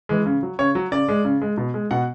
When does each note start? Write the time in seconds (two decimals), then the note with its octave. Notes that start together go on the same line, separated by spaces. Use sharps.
0.09 E3 G#3
0.26 C#3
0.43 F#3
0.59 C#3 C#5
0.75 F#3
0.92 C#3 D5
1.09 G#3
1.25 C#3
1.42 G#3
1.58 B2
1.74 G#3
1.91 B2 F#5